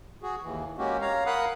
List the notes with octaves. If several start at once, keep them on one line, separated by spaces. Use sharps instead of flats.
F#4 G#4
D#2 E3
G#3 A#3 C#4 F#4 G4
C#5 F5 A#5
A#4 F5 F#5 B5 D#6 F#6